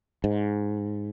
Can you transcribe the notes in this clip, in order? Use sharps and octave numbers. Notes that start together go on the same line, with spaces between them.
G#2